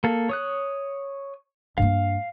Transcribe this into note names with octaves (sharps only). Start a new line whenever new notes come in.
A#3 A4
C#5 D#6 F#6
G2 A#3 F5